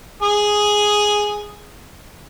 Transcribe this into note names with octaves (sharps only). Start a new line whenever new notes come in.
G#4 D#6